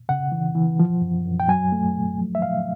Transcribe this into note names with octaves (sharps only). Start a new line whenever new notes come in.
C#3 F#5
E3
E3
F3
F#2
F#2
G5
F#3 G#5
A3
F#3
F3
E5
F3 F5